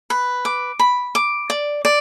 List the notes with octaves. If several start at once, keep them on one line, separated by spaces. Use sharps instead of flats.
B4
D6
B5
D6
D5
D5